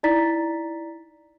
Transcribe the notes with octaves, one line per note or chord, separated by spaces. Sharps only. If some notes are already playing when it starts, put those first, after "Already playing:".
D#4 E4 D5 A#5 A6 B6